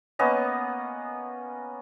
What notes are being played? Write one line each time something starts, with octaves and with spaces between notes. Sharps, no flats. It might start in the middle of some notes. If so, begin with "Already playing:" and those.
A#3 B3 C#4 D#5